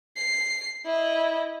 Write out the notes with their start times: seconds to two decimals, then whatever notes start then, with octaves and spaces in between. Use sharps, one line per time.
0.17 C7
0.86 E4 D#5